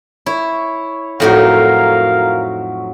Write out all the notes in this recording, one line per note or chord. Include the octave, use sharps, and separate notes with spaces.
E4 C#5
F2 A2 F#3 D#4 A#4 E5 F5